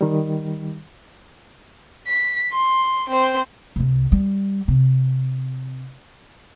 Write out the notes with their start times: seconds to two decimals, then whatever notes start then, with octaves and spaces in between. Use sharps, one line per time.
0.01 D#3 G3
2.07 B6
2.53 C6
3.09 C4 C5
3.76 C2 C3
4.12 G3
4.68 C3